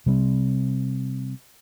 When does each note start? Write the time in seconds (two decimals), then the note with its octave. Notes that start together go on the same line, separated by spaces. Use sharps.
0.06 C3 G3 C4